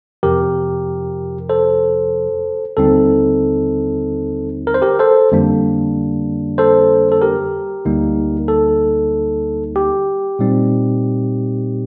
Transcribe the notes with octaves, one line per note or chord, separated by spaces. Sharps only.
F2 C3 F3 G4 A#4
A4 C5
D#2 D3 G3 C4 D#4 A4
A#4
C5
G4 A#4
A4 C5
F2 D3 G3 A#3 D4
A4 C5
A4
G4 A#4
D2 D3 G3 A#3 D#4
A4
G4
A#2 G3 C4 D#4